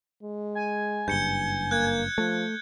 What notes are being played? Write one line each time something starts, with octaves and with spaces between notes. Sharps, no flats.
G#3
G#5
F#1 G2 G6 C#7 G7
A#3 F#6 G#6
F3 A3